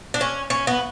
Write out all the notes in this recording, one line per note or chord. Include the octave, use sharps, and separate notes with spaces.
D4
C#4
C#4
B3